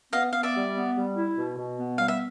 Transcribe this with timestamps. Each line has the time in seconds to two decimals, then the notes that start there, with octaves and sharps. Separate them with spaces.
0.12 B3 D#5 F5
0.33 B3 F5
0.43 D5 E5
0.54 G3
0.74 B3
0.95 G3
1.16 E4
1.37 B2
1.57 B2
1.78 B3
1.98 G3 F5
2.08 E5